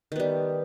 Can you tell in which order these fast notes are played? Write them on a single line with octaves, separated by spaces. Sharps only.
D#3 B3 G3